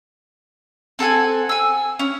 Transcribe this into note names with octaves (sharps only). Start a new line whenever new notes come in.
C4 A4 F#5 G#5
G#5 E6
C#4